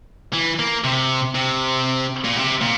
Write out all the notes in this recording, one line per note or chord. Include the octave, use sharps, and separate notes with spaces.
E3
A#3
C3
C3
A#2
C3
A#2